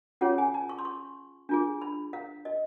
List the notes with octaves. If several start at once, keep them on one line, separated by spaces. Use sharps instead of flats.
C#4 F4 G#4 C#5 F#5
G#5
A5
C#6
C6
C#6
D4 F4 G#4
B5
F5
D#5